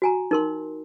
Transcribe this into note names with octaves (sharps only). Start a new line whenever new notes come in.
F#4 G#5 A#5
D#4 A#4 C6